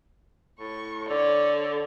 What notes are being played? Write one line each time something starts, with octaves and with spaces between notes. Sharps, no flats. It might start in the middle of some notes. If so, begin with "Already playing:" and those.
A2 C#6
D3 C#5 D5